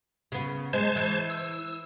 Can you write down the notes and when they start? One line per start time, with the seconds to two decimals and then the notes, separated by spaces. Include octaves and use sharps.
0.32 C#3 B3
0.73 G#3 C5 A5 G#6
0.96 E3
1.30 E6